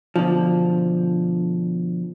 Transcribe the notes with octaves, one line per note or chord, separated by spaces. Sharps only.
B2 D3 F3